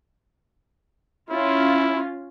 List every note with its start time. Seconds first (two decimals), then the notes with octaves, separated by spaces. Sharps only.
1.30 C#4 E4 F4